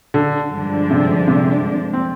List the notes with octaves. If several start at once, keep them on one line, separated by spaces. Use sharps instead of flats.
D3
G2 D3 F3 G#3 D4
C3
C3
C4